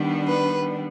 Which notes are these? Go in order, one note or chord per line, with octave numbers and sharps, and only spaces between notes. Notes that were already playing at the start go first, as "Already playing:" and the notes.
Already playing: D#3 G3 B3 D4
B4